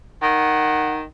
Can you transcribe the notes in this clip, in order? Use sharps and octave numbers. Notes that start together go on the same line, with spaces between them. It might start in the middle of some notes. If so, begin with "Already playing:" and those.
D#3 F#5